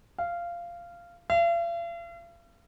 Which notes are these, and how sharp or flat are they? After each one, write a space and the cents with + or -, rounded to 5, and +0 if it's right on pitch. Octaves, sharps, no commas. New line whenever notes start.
F5 -15
F5 -45